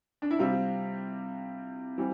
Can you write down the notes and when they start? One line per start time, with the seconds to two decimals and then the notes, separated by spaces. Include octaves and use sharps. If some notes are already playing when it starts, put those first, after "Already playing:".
0.22 D4
0.31 E4
0.39 C3 G3 C4 F4
1.98 E3 G3 C4